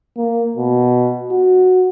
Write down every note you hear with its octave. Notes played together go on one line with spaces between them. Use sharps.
A#3
B2
F#4